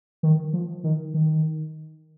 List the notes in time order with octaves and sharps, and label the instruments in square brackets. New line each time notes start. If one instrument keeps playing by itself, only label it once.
[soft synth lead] D#3
F3
D#3
D#3